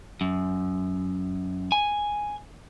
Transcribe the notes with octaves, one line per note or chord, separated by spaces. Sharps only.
F#2
G#5